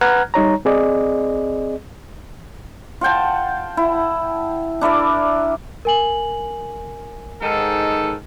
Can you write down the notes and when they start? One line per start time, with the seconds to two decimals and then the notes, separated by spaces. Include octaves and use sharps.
0.01 B4 F#5 A#5 F6 F#6 G#6
0.34 G3 D#4 C#5 A#5
0.65 C4 G#4 D5 D#5
3.01 F4 F#5 G5 A5
3.77 E4
4.81 D4 E4 A#4 D5
5.85 A#4 G#5 F#7
7.41 G#2 D#3 A4